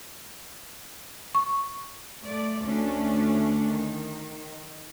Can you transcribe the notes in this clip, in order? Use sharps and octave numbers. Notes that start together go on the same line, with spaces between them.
C#6
A3 D5
D2 A3 C#4 D4
D#3